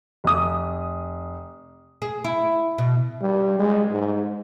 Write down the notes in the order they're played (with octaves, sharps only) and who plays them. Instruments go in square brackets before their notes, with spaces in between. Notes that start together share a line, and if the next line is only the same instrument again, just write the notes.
[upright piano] F1 D#6
[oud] G#4
E4
B2
[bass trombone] G3
G#3
G#2